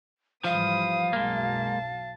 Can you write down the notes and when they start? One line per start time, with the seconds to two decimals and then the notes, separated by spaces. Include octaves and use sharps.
0.44 G#2 E3 F3 G3 F5 B5 D#6
1.13 B1 F#2 F#3 G#3 A#3 A5